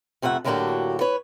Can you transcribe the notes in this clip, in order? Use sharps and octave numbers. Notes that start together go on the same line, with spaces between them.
F2 C3 A3 E5 F#5
A2 D3 F#3 A#3 F#4 G4
B4 C#5